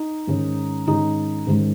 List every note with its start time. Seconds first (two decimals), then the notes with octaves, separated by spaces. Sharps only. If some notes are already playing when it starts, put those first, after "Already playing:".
Already playing: D#4
0.27 G#2 D#3 G#3 C#4
0.87 G#2 D#3 G#3 C#4 D#4
1.47 G#2 D#3 G#3 C#4